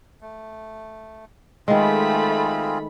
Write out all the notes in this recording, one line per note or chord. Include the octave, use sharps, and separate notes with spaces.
A3
D#3 G#3 A3 C4 F4 G#4 B5